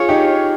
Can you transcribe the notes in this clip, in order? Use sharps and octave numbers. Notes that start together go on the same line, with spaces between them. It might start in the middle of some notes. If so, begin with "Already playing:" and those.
Already playing: F4 G#4 C#5
D#4 G4